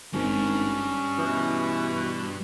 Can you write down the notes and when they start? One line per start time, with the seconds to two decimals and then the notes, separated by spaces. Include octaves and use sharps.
0.14 G#1 G2 C#4
1.18 B2 E3